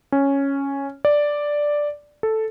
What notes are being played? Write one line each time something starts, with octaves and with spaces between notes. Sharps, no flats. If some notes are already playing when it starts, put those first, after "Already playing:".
C#4
D5
A4